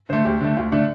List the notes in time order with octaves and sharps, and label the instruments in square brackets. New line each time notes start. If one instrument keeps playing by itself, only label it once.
[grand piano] D3 [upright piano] C5
[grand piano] A3
[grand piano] D2 [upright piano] G4
[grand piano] D3 A3
[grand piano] D2 [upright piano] F4
[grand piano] D3 A3 [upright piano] D4